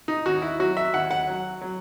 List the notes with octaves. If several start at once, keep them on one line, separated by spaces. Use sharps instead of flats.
D#4
D#2 F#4
E4
F#3 F#4
E5
D#2 F#5
F#5
F#3
F#3